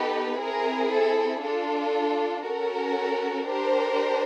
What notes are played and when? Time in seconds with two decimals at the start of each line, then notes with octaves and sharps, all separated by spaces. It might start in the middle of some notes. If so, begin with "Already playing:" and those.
Already playing: B3 D#4 G4 A4 B4
0.39 C4 E4 G#4 A#4
0.91 A4
1.43 D4 F4 A4
2.45 C#4 F#4 A4 A#4
3.48 D4 G4 A#4 C5